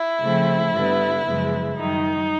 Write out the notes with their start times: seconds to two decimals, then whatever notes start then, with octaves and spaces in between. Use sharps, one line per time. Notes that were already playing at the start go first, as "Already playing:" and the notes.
Already playing: E4
0.20 C#3 F3 A3 C4
0.72 G2 D3 G3 B3
1.24 F#2 C#3 F3 G#3 B3
1.76 F#2 D#3 G3 D#4